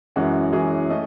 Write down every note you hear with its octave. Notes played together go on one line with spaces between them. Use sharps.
F#2 E3 G#3 C#4 F#4
F#2 E3 G#3 C#4 G#4
A3 C#4 D#5